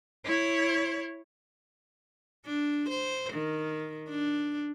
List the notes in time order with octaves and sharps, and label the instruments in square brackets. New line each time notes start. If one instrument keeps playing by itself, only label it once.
[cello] E4 C#5
[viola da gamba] D4
C5
D#3
D4